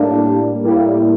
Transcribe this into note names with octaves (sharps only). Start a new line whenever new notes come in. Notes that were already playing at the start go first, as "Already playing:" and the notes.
Already playing: A2 G3 A#3 D4
A2 G3 A#3 E4